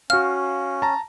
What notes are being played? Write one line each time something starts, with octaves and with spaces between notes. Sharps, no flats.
C#4 F#4 F5 F6
A5 A#5